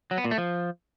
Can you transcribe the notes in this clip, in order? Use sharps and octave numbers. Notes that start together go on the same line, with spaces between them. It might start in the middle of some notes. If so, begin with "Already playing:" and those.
F#3
B3
A#2
A3
F3